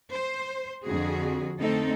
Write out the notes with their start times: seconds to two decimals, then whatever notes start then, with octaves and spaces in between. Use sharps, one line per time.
0.11 C5
0.84 F2 D3 F#4 G#4
1.58 D3 A3 C4 D#4 A4